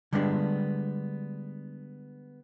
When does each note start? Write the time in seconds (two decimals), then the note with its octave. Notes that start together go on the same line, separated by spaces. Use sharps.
0.13 D3 G3 G#3 B3 C#4 D4